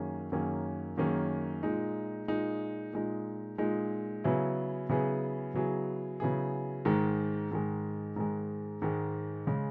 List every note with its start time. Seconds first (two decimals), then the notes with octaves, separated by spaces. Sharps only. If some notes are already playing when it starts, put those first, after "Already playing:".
Already playing: F#2 D#3 A#3 C#4 G#4
0.32 F#2 D#3 A#3 C#4 G#4
0.97 F#2 D#3 A#3 C#4 G#4
1.63 A#2 G#3 D#4
2.28 A#2 G#3 D#4
2.93 A#2 G#3 D#4
3.58 A#2 G#3 D#4
4.24 C#3 F#3 B3 E4 G#4
4.89 C#3 F#3 B3 E4 G#4
5.54 C#3 F#3 B3 E4 G#4
6.20 C#3 F#3 B3 E4 G#4
6.85 G#2 D#3 G#3
7.51 G#2 D#3 G#3
8.16 G#2 D#3 G#3
8.82 G#2 D#3 G#3
9.47 C#3 G#3